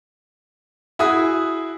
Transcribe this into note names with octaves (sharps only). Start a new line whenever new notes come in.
E4 F#4 G#4 D#6